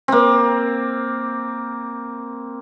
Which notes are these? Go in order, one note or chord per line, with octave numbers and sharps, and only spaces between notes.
A#3 C4